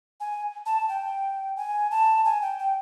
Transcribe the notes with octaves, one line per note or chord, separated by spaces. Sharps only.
G#5
A5
G5
G#5
A5
G#5
G5
G5